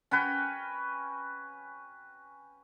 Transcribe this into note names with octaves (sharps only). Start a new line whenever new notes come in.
C#4 F#4 B4 G5